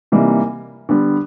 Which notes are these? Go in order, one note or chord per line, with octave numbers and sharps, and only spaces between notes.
C3 E3 G3 A#3 D#4
D3 G3 B3